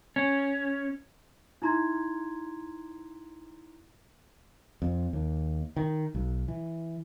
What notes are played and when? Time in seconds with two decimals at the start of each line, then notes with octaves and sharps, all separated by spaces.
0.16 C#4
1.62 D#4 E4 A#5 C6 G#6
4.82 F2
5.13 D#2
5.76 D#3
6.15 B1
6.48 E3